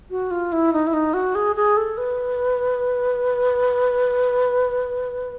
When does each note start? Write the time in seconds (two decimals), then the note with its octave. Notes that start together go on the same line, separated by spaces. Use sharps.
0.11 F#4
0.31 F4
0.52 E4
0.73 D#4
0.87 E4
0.93 D#4
1.14 F#4
1.35 G#4
1.56 G#4
1.77 A4
1.98 B4